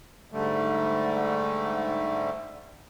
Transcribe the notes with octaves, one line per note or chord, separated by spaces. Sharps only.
G#2 D3 G3 A3